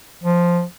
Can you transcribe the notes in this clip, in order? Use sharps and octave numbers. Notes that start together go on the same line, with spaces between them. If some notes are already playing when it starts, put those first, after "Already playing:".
F3